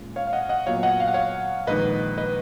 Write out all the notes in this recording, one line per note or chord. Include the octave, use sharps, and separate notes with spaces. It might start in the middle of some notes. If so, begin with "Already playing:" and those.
Already playing: A#2 G#3 C#4
C#5 F5
F5
D#5 F#5
D#5 F#5
A#2 F#3 B3 C#5 F5
D#5 F#5
F5
F#5
C#5 F5
A#1 G#2 D#3 B4 D#5
B4 D#5